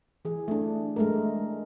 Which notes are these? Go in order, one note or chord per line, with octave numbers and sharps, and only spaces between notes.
E3 G#4
A3 D4
G#3 A3 A#4